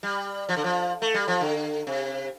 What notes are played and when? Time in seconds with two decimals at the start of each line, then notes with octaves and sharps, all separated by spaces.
0.03 G3
0.49 F3
0.57 D3
0.64 F3
1.02 A3
1.14 G3
1.28 F3
1.41 D3
1.87 C3